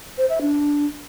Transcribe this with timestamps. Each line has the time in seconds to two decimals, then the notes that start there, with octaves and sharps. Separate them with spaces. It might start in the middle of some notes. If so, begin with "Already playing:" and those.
0.18 C5
0.30 E5
0.41 D4